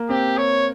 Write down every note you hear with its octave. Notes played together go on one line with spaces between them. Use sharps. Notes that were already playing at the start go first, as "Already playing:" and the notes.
Already playing: A#3
C4 G4
C#5